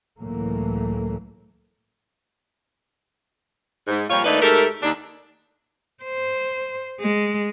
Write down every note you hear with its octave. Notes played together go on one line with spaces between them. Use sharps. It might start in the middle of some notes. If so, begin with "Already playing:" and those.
C#2 A2 E3 F#3 A3 A#3
G#2
A#2 F3 G3 F4 C#5
D#3 A3 A#3 D4 D#4 B4
G#2 A3 G4 A4 A#4
D#2 D4
C5
G#3